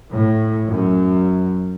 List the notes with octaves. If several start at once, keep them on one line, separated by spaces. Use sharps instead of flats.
A2
F#2